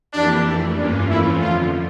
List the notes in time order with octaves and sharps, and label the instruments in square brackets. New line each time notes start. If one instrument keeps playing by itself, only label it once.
[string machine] F2 E3 A#3 E4 G4 [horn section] D4
[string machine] F2 E3 A3
[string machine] G2 E3 A#3 C#4 F4 [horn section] D4
[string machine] F2 E3 A3 C#4 F4 [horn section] E4
[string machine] F2 D3 F3 [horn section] F4